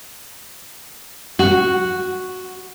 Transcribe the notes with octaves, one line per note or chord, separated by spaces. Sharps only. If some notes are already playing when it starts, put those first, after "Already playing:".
F#4